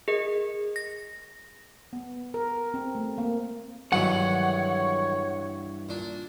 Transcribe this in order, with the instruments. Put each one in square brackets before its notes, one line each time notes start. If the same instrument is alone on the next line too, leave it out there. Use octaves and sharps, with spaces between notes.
[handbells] G#4 A#4 D#5
A#6
[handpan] B3
A#4
C4
A3
A#3
[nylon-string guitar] G2 E3 [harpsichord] D#3 F#3 G#3 [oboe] C#5 [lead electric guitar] F#5
[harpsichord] A#2 D4